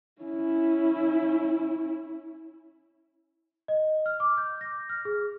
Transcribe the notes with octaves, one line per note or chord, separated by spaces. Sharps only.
C#4 E4
D#5
F6
D6
G6
A#6
F6
G#4